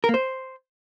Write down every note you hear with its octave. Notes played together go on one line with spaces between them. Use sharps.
A#4
A#3
C5